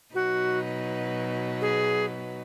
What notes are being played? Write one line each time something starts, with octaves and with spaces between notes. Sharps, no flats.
B2 F#3 D#4 F#4 B4
G#4